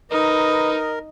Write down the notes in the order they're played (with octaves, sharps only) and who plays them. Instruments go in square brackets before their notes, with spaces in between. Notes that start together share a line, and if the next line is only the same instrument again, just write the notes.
[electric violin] D#4 [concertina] A#4 [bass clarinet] B4 [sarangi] D#5